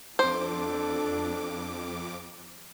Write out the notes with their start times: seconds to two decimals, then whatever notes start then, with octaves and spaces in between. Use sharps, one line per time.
0.19 F2 D4 A4 C5 D6